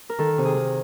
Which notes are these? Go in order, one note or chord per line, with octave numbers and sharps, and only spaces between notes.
A#4
D#3 A4
C3
G#4
D#3